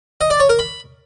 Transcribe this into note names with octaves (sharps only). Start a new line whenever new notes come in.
D#5
D5
C#5
A#4
B5